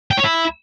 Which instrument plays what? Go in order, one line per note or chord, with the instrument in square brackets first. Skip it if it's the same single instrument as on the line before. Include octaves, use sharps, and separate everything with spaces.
[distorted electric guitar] G5
C#5
E4